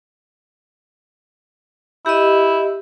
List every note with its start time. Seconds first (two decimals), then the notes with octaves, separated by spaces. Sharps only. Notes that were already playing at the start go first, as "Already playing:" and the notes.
2.06 E4 G4 D#5